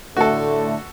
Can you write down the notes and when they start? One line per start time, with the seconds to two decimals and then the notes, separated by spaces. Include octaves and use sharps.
0.17 A2 D3 A3 F#4 A4